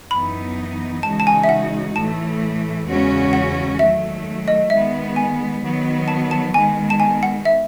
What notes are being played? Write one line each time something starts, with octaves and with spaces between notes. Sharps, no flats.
F#2 E3 B3 D#4 B5
C#3 E3 G#3 D#4 F#4 A5
A5
G#5
E5
F#5
A2 E3 A3 A5
E2 C#3 G#3 C#4 F#4
F#5
D#3 F#3 A3 E5
D#5
D#3 G#3 B3 E5
G#5
D#3 F#3 B3
A5
A5
D#3 G#3 B3 G#5
A5
G#5
F#5
E5